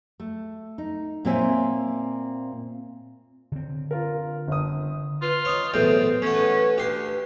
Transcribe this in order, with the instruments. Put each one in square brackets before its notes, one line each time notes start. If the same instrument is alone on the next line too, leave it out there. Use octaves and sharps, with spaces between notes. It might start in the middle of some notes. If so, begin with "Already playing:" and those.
[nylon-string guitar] A3
D#4
A#2 A#3 C4 C#5 E5 G#5
[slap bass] D3 C4
[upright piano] F4 A#4
G1 D#6
[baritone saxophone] F4 [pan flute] B4
[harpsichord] D#4 C#5 [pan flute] D#6
[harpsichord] B1 E2 A2 [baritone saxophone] C4 [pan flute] B4
[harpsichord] A3 F#4 [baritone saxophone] C#4
[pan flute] B4
[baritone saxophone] D2 [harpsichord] G4 C6